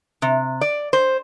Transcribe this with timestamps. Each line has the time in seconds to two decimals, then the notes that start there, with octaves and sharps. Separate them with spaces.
0.22 C3
0.61 D5
0.93 C5